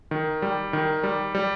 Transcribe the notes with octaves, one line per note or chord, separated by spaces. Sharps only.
D#3
G3
D#3
G3
G3